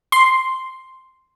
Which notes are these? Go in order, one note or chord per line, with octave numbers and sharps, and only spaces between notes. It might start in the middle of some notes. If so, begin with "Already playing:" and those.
C6